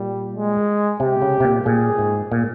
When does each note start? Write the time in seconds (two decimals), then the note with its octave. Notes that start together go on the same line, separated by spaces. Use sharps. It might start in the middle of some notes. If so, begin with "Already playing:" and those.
Already playing: A#2 G3
0.34 G#3
1.00 C3 G4
1.22 C#3
1.40 C3
1.44 A#2
1.66 A#2 G#4
1.99 G#2
2.32 A#2